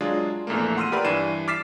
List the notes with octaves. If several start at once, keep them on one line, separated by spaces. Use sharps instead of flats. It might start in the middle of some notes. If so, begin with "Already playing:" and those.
F#3 G#3 D4 F4 G#4
A#1 E2 A3 A#3
F#5 C6 E6 F6 D#7
G4 A#4 B4 D5 B5
G2 E3 D4 C7 D#7 E7
D6 F6 A6 B6 C7 E7